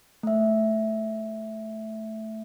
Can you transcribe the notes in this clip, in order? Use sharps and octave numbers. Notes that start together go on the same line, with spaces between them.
A3 E5